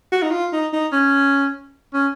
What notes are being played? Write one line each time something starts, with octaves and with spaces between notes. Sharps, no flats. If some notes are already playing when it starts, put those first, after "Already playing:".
F#4
D#4
F4
D#4
D#4
C#4
C#4